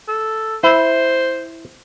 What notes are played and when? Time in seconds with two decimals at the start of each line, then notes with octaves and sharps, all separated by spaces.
0.08 A4
0.63 E4 C5